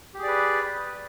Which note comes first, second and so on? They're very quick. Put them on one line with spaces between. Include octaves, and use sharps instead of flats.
G4 G#4 D5 B4